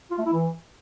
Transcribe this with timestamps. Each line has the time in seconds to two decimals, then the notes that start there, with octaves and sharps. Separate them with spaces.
0.11 F4
0.18 A3
0.25 E4
0.33 E3